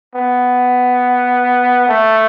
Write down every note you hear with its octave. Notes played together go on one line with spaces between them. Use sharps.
B3
A3